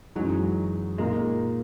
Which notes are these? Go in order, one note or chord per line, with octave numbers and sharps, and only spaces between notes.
F#2 E3 F#3 G#3 D#4
A#2 G#3 A#3 D#4